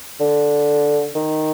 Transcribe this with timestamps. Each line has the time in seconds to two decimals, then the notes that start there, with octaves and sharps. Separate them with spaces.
0.20 D3
1.16 D#3